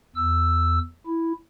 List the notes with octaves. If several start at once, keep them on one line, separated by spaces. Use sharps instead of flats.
E2 E6
E4